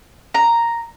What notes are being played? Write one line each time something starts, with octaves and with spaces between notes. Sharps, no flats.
A#5